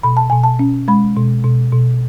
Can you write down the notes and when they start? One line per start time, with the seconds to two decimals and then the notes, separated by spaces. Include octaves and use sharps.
0.03 B2 B5
0.17 A5
0.30 B2 G#5
0.44 A5
0.59 C#4
0.88 G#3 B5
1.16 B2
1.44 B2
1.73 B2